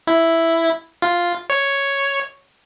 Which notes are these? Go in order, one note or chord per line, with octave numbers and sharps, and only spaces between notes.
E4
F4
C#5